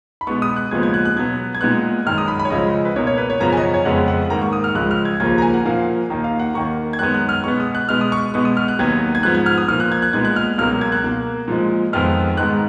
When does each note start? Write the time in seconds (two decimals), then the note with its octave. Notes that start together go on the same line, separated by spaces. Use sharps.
0.21 B5
0.27 B2 G#3 B3 C#6
0.42 D#6
0.56 F#6
0.71 D#2 C#3 F3 G#3 B3 G#6
0.83 G#6
0.94 F#6
1.05 F#6
1.16 B2 F#3 B3 G#6
1.55 G#6
1.61 A#2 G#3 B3 F#6
2.06 F#2 D#3 G#3 F6
2.18 D#6
2.28 B5
2.39 B5
2.45 C#5
2.50 C#2 C#3 F3 G#3 D#5
2.85 B4
2.96 B2 A#3 C#5
3.07 C#5
3.18 B4
3.30 C#5
3.40 F#2 C#3 F3 B3 A#5
3.52 G#5
3.57 D#5
3.63 C#5
3.74 C#5
3.85 F2 C#3 G#3 B3 F#5
4.08 F#5
4.30 G#2 D#3 A#3 A#5
4.42 C#6
4.53 D#6
4.64 F6
4.75 C#2 C#3 F3 G#3 F#6
4.91 F6
5.05 G#6
5.20 D#2 C#3 F3 A#3 G#6
5.38 A#5
5.42 G#5
5.54 F#5
5.66 A#2 F3 A#3 F5
6.10 D#2 D#3 A#3
6.24 F5
6.40 F#5
6.54 D#2 D#3 A#3 C#6
6.93 G#6
6.99 F#2 D#3 G#3 B3 F#6
7.14 F#6
7.29 F6
7.44 B2 G#3 B3 C#6
7.60 D#6
7.75 F#6
7.89 B2 G#3 B3 F6
8.01 D#6
8.12 C#6
8.34 B2 G#3 B3 C#6
8.45 D#6
8.57 F6
8.68 F#6
8.79 D#2 D#3 F#3 B3 G#6
9.15 G#6
9.23 G#2 F3 B3 F#6
9.35 G#6
9.46 F6
9.58 D#6
9.68 A#2 F3 A#3 F6
9.80 F#6
9.92 G#6
10.02 F#6
10.13 A#2 G#3 B3 G#6
10.25 F#6
10.36 F6
10.58 C#2 B2 F#3 A#3 F6
10.81 G#6
10.92 F#6
11.04 B2 A#3
11.48 A#2 F3 G#3
11.93 F2 D#3 G#3 B3 F6
12.37 G#2 D#3 G#3 B3 F#6